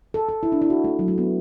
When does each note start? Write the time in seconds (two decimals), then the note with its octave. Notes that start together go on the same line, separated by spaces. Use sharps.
0.14 A4
0.29 A4
0.43 E4
0.52 D4
0.62 E4
0.70 F#4
0.84 A3
0.99 F#3
1.08 A3
1.18 B3